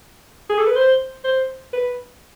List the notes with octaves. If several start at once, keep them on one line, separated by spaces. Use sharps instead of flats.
G#4
A4
B4
C5
C5
B4